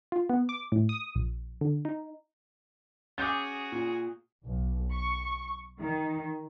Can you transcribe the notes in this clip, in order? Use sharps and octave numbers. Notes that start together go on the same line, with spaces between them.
F4
B3
D6
A2
D#6
A#1
D3
D#4
C#4 F#4 G#4 D6 G6 A6
A#2
B1
C#6
D#3